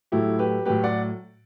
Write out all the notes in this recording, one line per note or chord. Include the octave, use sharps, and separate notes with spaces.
A2 F#3 A3 E4 G4
G4 B4
A2 F#3 A3 G4 B4
D5 F#5